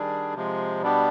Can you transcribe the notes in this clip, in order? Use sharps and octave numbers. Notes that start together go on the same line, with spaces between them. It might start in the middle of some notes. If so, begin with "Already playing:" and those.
Already playing: D#3 G3 D4 G#4
C3 F3 G#3
B2 G3 B3 D4 G4